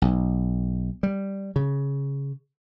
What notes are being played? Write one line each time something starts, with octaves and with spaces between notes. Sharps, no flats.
B1
G3
C#3